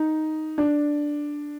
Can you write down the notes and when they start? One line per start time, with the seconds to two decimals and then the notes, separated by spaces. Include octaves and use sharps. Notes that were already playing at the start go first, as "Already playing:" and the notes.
Already playing: D#4
0.58 D4